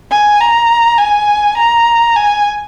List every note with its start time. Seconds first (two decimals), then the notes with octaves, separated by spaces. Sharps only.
0.11 G#5
0.41 A#5
0.98 G#5
1.57 A#5
2.16 G#5